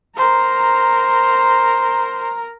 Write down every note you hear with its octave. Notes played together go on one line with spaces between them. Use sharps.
A#4 C5 A#5